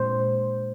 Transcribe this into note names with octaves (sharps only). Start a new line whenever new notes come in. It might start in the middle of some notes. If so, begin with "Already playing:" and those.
Already playing: A#2 G#3 D4 C5